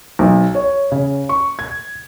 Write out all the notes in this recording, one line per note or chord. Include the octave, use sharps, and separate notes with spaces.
B1
C#5
C#3
C#6
G#6